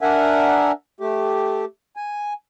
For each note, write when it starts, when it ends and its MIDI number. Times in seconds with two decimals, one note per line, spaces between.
0.01 0.72 62
0.01 0.72 70
0.01 0.72 76
0.01 0.72 78
0.01 0.72 80
1.00 1.65 57
1.00 1.65 67
1.96 2.33 80